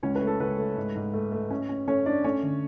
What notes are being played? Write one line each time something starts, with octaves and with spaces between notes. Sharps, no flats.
C#2 C#4 C#5
B4
A3
A4
C#2 B4
A3
G#2
G#2
A3
A3
C#4
C#4
A3 C#4 C#5
A3 D4 D5
A3 C#4 C#5
D3